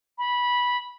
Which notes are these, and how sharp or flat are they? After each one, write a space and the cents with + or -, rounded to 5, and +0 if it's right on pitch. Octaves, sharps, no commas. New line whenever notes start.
B5 -15